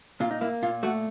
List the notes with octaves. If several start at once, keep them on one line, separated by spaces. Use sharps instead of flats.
A#2 F4
D#4
A#3 E4
A#2 F4
A3 F#4